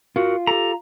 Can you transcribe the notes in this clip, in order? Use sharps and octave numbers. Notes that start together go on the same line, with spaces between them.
F4 F#4 A#4
G4 A4 A#5